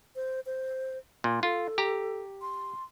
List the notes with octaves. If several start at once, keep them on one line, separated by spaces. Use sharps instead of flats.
C5
C5
A#2 F5
F4 A4
G4 A#5
C6